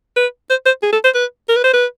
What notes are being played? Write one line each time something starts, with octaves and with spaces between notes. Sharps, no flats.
B4
C5
C5
G#4
A4
C5
B4
A#4
B4
C5
B4